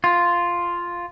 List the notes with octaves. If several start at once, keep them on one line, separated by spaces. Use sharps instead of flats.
F4